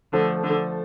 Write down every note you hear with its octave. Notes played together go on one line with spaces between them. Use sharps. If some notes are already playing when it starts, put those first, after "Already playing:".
D3 F3 A3
D3